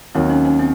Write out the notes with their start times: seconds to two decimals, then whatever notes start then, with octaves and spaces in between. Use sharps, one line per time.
0.15 D#2 D#3 F#3 C4
0.30 C#4
0.45 C#4
0.59 C4